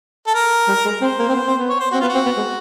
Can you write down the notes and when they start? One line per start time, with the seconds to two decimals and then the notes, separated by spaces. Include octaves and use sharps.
0.27 A4
0.34 A#4
0.68 G3
0.85 G#3
1.01 C4 C5
1.19 A#3
1.28 C4
1.35 B3
1.47 C4
1.58 B3
1.69 C#5
1.80 C5
1.92 C4 F#4
2.00 B3 F4
2.09 F#4
2.15 C4
2.25 B3
2.37 G#3